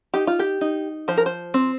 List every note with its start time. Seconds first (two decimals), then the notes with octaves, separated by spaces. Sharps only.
0.14 D#4 G4
0.27 F4
0.39 G4
0.61 D#4
1.08 F3 C5
1.17 A#4
1.26 C5
1.54 C4